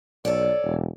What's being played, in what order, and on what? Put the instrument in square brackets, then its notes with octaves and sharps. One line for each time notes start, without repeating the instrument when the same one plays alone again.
[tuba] B1 [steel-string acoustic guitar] A4 C#5 D5
[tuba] E1